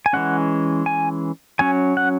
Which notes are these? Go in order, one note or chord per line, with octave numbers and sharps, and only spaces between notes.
G#5
E3 G#3 C#4 F#5
G#5
F#3 C#4 G#5
F#5